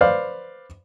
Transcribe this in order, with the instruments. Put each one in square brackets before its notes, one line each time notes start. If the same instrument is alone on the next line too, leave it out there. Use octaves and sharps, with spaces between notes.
[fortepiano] B4 C5 D5 F5